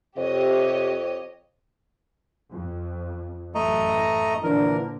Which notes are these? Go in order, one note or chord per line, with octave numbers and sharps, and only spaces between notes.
F2 C3 G4 C#5 D#5
F2
A1 F#2 E3 A3 D#5 A#5
A#2 D3 E3 F3 D4 A#4